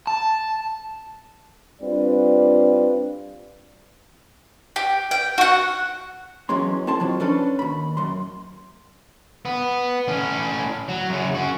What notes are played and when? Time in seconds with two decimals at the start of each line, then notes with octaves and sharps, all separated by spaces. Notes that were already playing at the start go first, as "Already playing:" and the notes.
0.07 A5
1.81 G3 C4 D4 F4 B4 D5
4.76 G4
5.11 G5
5.38 F#4 F#5
6.49 E2 E3 F#3 G#3 C#4 C6
6.87 C4 E4 A5 C6
7.00 F2 F3 F#3
7.20 C#4 D4 A4 B4
7.59 D#2 B5
7.97 F#2 C6
9.45 B3
10.08 A2 C#4
10.89 F#3
11.09 F#2 C#3
11.35 C#4 F#4